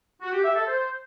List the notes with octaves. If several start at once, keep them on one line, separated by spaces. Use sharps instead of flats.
F#4
G4
E5
A4
C5